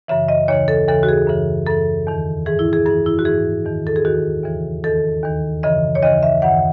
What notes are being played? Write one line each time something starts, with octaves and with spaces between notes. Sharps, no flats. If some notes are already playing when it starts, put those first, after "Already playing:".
F#2 C#3 E3 E5
D#5
D#2 C#3 E3 C#5
A4
D#2 C#3 E3 A4
F#4
G#4
F#2 C#3 E3
F#2 E3 A4
E2 D#3
G#2 E3 G#4
E4
G#4
F#2 E3 G#4
E4
F#4
G#2 E3 G#4
E2 D#3
A4
G#4
D#2 D#3 F#4
D#2 C#3 E3
E2 D#3 A4
D#2 D#3
F#2 C#3 E3 D#5
C#5
D#2 C#3 E3 D#5
E5
F#2 D#3 F#5